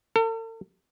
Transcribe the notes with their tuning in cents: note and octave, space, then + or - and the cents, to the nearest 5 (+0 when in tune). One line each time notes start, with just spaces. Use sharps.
A4 +45